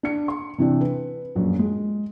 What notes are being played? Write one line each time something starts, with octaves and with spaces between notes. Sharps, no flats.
D4 C#7
C6
C3 E3 C4 D4
B4
A#1 F#2
G#3